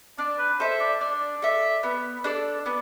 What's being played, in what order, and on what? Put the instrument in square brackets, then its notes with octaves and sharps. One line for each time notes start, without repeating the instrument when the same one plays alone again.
[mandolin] D4 [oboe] D5
[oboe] B4
[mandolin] A4 E5 [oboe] C5
[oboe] D5
[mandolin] D4 [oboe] D5
[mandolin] A4 E5
B3
D4 A4 D5
[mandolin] B3 [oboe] D5